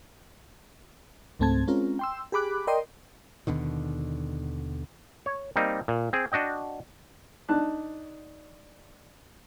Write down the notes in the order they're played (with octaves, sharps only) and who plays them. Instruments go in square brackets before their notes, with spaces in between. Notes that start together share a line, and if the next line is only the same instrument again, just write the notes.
[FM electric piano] C#2 G#2 A3 C4 A5 G#6
G#3 C4 C#4 F4 A#4
G5 C6 E6
G4 G#4 B5 D6 F#6
A#4 D5 D#5 G5 C6 D#6
[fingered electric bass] D#2 B2 D3 D#3
[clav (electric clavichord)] C#5
G3 A#3 C4 D#4
A#2
C4 G#4
D4 F#4 D#5 G5
[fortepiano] D4 D#4 A5 F#6